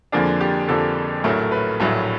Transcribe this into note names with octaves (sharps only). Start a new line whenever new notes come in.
F2 D3 F3 A#3 D4 G#4
G4
F2 D3 F3 A#3 D4 A4
A#1 A2 F#3 A3 A#4
B4
A#1 A2 F#3 A3